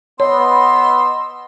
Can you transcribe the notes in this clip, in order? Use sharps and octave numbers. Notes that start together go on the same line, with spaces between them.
B3 C#5 D#5 C6 E6